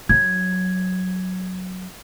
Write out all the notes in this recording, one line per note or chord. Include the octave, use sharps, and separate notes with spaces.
F#3 G#6